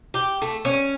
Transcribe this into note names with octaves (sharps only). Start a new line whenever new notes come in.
G4
A3
C#4